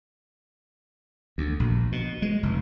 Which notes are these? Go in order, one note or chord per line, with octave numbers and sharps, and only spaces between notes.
D2
A#1
B2
G#3
F1